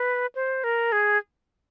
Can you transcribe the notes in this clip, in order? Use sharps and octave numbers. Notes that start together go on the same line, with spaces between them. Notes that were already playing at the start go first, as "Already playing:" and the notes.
Already playing: B4
C5
A#4
G#4